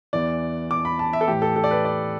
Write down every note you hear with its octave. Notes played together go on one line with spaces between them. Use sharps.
E2 E3 D5
D6
B5
A5
E5
A4
A2 E3 G4
A4
A4
D5
B4
D5